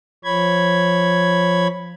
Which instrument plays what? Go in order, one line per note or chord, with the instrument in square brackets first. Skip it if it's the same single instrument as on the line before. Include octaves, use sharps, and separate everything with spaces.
[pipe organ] F3 C#5 B5 G#6